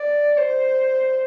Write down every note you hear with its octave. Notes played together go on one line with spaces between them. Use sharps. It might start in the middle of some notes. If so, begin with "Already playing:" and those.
Already playing: D5
C5